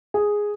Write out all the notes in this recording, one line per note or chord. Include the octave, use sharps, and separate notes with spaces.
G#4